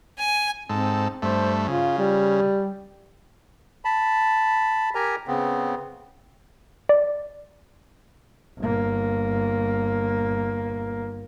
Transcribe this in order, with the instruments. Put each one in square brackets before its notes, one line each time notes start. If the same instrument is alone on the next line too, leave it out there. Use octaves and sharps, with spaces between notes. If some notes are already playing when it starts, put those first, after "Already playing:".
[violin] G#5
[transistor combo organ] G#2 A4 [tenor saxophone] C4
[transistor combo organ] G2 A3 [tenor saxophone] C5
[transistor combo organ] C#3 [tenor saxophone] F4
[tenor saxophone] G3
[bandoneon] A5 B5
G4 A#4 G#5 A#5
C#3 B3 C4
[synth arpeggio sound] D5
[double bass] G1 A#3